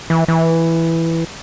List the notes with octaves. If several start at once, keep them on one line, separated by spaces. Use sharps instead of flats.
E3
E3